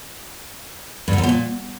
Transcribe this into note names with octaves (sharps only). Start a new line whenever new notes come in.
G2
D3
F#2
B2
A#2